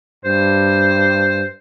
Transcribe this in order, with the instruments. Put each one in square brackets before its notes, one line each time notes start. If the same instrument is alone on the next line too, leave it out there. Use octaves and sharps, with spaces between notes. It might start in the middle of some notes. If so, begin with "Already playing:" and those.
[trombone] G2 [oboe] C5